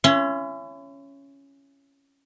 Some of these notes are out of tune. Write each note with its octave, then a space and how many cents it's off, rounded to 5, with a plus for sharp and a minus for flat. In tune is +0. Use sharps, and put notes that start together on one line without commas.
C#4 +0 E4 +40 C6 +0